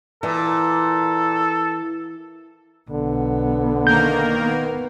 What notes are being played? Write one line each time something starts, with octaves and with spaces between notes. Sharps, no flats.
A#2 E3 A4
B1 D3 B3
D#3 A#3 A#4 G6
B3